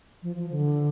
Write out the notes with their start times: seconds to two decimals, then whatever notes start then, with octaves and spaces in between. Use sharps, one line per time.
0.23 F3
0.36 F3
0.50 D3